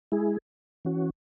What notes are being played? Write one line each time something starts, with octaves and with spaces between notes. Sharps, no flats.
G#3 E4 G#4
E3 C#4 F#4